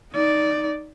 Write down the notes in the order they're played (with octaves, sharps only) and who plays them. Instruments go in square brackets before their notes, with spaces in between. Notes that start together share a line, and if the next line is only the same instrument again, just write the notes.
[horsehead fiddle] D#4 D5